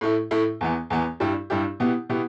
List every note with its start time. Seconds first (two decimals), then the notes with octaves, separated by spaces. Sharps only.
0.01 A2 A3 E4
0.31 A2 A3 E4
0.61 E2 E3 B3
0.90 E2 E3 B3
1.20 G2 G3 E4 G4
1.50 G2 G3 E4 G4
1.80 B2 B3 E4 G4
2.09 B2 B3 E4 G4